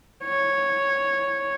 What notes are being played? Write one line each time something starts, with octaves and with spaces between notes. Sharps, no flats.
C#5